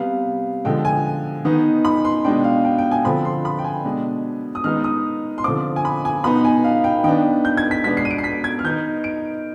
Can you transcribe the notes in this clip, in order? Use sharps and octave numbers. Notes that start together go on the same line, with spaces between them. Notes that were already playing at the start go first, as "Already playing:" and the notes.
Already playing: C3 G3 B3 F5
D3 F3 G#3 G5
G#5
D#3 B3 D#4
B5
C6
B2 G#3 D4 G5
F5
G5
G5
G#5
D3 F3 C4 B5
C6
B5
G5
G#5
B2 G#3 D4
D#6
D#3 G#3 B3 D#4 F6
D#6
C6
D3 F3 C4 D6
G#5
B5
G#5
B2 B3 D#4 B5
G#5
F5
G5
D#3 B3 D4 G5
G6
G#6
B6
B2 G#3 B3 D4 B6
C7
D#7
D7
C7
B6
G#6
F6
D#3 B3 D#4 G6
D7